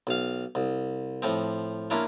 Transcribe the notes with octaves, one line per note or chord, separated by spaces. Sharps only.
B1 F5
C2
A2 F3 C4
A#3 C#4 D4 E4 F4